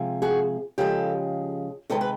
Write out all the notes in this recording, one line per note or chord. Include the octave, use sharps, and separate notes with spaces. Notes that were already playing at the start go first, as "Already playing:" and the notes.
Already playing: C3 F3 G#3
F#4 G#4
C#3 F3 G#3 G4 A4
C3 D#3 G#3 A4 B4
B4